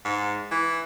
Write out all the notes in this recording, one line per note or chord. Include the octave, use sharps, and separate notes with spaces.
G#2
E3